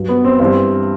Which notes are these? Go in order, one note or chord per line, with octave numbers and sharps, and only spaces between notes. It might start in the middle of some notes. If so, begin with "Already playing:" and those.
Already playing: G2 F#3
B3
C4
G2 E3 G3 C4